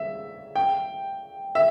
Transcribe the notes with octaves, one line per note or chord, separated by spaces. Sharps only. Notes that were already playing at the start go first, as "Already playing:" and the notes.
Already playing: E5
G5
E5